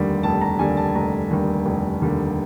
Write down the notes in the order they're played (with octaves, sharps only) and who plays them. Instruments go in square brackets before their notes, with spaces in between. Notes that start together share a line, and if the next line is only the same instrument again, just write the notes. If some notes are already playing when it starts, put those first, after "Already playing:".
Already playing: [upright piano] F1 D#2 D3 G3
F1 A5
A#5
D#2 D3 G3 G#5
A5
F1 A#5
D#2 D3 G3
F1
D#2 D3 G3